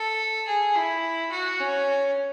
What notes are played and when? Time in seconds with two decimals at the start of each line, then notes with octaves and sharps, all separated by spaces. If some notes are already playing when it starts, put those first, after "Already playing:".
Already playing: A4
0.47 G#4
0.76 E4
1.31 F#4
1.60 C#4